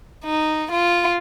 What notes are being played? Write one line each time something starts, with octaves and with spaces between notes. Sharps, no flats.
D#4
F4